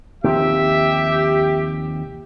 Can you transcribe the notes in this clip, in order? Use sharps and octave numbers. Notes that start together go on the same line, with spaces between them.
D#2 C3 F3 G4 E5